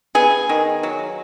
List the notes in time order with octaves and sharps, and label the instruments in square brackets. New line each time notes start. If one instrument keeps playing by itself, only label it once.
[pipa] B3 G#4
D#3
F#3